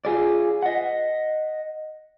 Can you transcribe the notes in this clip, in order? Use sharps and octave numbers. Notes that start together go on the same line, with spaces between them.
F4 G#4 D5
D#5 F#5